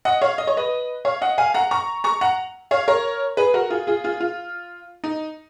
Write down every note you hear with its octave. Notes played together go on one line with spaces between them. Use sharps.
D#5 F#5
C#5 F5
D#5
C#5
B4 D#5
C#5 F5
D#5 F#5
F5 G#5
F#5 A#5
A#5 C#6
A#5 C#6
F#5 A#5
C#5 F5
A#4 C#5
G#4 B4
F#4 A#4
F4 G#4
F4 G#4
F4 G#4
F4
D#4